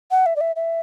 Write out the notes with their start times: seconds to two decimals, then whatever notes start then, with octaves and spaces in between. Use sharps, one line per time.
0.11 F#5
0.26 E5
0.36 D5
0.41 E5
0.56 E5